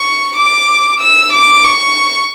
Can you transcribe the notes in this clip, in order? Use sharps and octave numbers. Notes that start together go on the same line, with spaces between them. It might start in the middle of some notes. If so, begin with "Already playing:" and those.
Already playing: C#6
D6
E6
D6
C#6